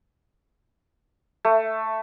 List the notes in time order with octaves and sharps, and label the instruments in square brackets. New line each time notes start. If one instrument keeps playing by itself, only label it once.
[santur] A3